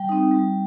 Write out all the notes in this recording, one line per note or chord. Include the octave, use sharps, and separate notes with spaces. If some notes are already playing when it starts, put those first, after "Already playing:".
Already playing: G3 G5
C4 D#4
G3